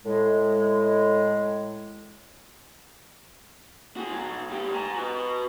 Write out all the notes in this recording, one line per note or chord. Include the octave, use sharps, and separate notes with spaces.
A2 G#3
F#4 G#4
B2 F#3
G#2 G4
G#5 A#5
F#4 B4